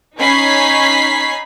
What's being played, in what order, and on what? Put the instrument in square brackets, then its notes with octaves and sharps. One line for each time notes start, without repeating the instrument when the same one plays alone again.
[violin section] C#4 D#4 B5 G#6 B6 C7